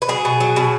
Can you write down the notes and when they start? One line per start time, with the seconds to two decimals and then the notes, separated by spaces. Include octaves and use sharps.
0.02 B4
0.08 F#3 G#4
0.25 B2
0.40 F#3
0.56 B2